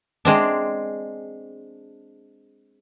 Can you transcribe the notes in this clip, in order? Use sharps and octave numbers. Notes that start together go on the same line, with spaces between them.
G#3 C4 D4